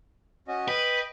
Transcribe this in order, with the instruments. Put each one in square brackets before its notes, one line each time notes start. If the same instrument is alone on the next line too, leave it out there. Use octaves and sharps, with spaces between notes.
[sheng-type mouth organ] C#4 F#4 D#5
[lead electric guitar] B4 [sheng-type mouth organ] D#5 G5